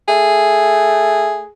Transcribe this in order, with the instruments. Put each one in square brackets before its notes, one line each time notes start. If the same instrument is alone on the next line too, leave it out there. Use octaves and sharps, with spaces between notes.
[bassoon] A3 [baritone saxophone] G#4